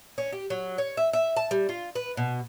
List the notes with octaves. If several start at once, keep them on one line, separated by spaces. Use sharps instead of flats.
C#4
G4
F#3
C#5
E5
E5
A5
G3
F4
B4
B2